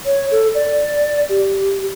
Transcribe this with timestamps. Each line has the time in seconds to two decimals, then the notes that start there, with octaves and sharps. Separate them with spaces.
0.05 C#5
0.31 A4
0.54 D5
1.29 G4